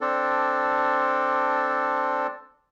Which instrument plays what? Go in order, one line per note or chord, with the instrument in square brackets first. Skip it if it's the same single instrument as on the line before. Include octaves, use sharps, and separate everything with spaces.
[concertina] C4 D4 A4